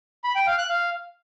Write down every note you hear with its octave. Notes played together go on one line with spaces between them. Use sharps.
B5
G5
F5
F#6
F5